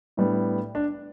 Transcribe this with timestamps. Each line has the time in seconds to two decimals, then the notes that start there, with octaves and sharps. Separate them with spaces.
0.17 A2 G3 B3 D4
0.75 D4